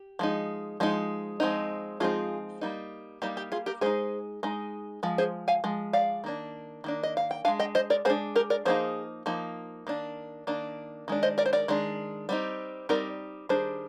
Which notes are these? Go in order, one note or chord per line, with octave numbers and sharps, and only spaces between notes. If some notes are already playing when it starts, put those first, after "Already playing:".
Already playing: G4
F3 G#3 D#4
F3 G#3 D#4
F3 G#3 C4 D#4
F3 G#3 C4 D#4 F4 G#4
G3 A#3 D#4
G3 A#3 D#4 G4
G4
F4 G#4
G4 A#4
G#3 D#4 G#4 C5
G#3 D#4
F3 G#3
G#4 C5
F5 G#5
F3 G#3
D5 F5
D#3 A#3 D4
D#3 A#3 D4
D#5
F5
G5
G#3 D4 F5 G#5
D#5 G5
C5 D#5
A#4 D5
G#3 D4 G#4 C5
G4 A#4
A#4 D5
F3 A#3 D#4 G#4 C5
F3 A#3 D#4
D#3 A#3 D4
D#3 A#3 D4
D#3 G#3 D4
C5 D#5
A#4 D5
C5
A#4 D5
D#3 G#3 D4
G3 C4 D#4
G3 C4 D#4 A#4 D5
D#3 G3 D4 G#4 C5